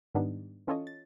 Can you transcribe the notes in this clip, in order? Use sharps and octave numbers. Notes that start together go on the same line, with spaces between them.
G#2 D#3 G3 B3 D4 D#4
E3 C#4 F4 A4 C#5 D#5
A6